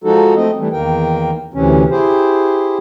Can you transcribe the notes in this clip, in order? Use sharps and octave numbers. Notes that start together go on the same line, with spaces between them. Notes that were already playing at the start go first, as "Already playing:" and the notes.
F3 G#3 D#4 F#4 A4
A3 C4 D#5
E3 G3 A3
E2 D#3 A#3 A#4 G5
D2 C3 E3 C#4
E4 G4 G#4 C5